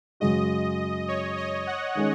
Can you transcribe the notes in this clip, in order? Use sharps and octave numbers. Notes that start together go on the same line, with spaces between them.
F#2 C#3 G#3 F#4 D#5
C#5
D#5
F#5
D#3 G#3 C#4 G#4